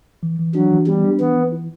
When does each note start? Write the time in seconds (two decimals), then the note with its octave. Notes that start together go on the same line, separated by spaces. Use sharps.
0.23 E3
0.39 E3
0.55 F#3 D4
0.71 E3
0.87 G3 B3
1.04 D4
1.20 E3 B3
1.36 E3
1.52 E4